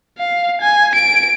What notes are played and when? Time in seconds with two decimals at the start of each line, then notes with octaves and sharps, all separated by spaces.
0.19 F5
0.62 G#5
0.95 D7